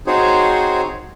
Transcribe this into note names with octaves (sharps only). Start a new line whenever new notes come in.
C4 D#4 F#4 G#4 C5 C#5